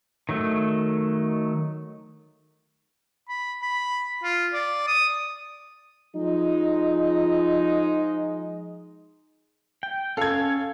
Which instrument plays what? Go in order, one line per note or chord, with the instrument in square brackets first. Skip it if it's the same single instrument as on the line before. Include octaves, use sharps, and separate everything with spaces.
[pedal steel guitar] D#3 F#3 A3
[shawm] B5
B5
F4
D5
D#6
[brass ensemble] F3 G#3 D#4
[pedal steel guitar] G5
[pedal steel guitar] C#4 F5 [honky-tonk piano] A4 G#6